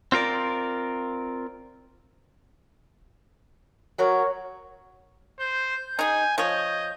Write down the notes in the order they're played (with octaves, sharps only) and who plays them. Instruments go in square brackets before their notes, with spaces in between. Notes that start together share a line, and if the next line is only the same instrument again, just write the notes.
[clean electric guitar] C4 F4 A#4 D5
[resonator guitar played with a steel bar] F#3 F#4 A#4 [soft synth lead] C#5
[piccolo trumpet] C5 [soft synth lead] G6
[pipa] D#4 G#4 [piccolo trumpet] G#5
[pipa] F3 C#5 [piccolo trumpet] D#5